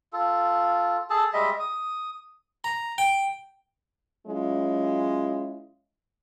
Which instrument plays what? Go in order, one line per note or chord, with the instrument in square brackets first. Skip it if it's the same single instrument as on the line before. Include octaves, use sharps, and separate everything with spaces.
[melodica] F4 A4
G#4 A4 A5
G3 G#3 D#5 E5
D#6
[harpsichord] A#5
G5
[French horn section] F#3 G#3 C#4 E4 F4